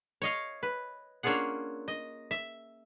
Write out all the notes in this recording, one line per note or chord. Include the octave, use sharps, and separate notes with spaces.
C#5 D#5 F5
B4
A#3 C#4 D4 F4 G#4 F#5
D#5
E5